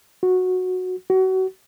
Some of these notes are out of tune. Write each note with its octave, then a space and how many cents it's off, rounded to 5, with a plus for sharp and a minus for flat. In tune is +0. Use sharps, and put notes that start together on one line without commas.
F#4 -10
F#4 +30